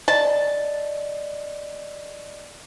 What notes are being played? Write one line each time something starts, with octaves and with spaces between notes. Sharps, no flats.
D5 D#5 A5